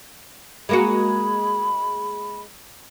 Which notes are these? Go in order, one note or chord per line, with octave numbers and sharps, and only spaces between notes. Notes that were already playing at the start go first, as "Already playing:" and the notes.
G#3 A#3 F#4 B5